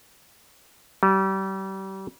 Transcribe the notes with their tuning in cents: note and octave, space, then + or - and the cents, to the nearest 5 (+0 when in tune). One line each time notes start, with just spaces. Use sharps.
G3 -30